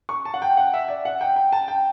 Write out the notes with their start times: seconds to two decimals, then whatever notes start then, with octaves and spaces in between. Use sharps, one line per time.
0.09 C#6
0.25 A5
0.34 F#5
0.42 G5
0.57 F#5
0.73 E5
0.88 D5
1.05 F#5
1.21 G5
1.36 G5
1.52 A5
1.68 G5